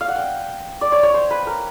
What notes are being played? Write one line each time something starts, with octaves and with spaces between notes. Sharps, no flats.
F5
F#5
G5
D5
C#5
C#5
C5
B4
A#4